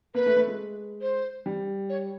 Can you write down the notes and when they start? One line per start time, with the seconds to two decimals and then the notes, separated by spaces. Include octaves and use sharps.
0.15 A#3 B4
0.26 A3
0.36 A3
0.47 G#3
1.01 C5
1.46 G3
1.89 C#5